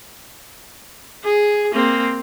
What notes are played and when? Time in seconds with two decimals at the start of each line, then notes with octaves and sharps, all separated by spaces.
1.24 G#4
1.73 A#3 C4